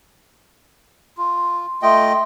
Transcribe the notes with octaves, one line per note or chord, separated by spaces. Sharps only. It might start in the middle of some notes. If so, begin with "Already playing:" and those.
F4
A3 F4 D#5 G5